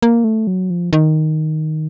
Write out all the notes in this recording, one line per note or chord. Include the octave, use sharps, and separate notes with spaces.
A#3
A3
F#3
F3
D#3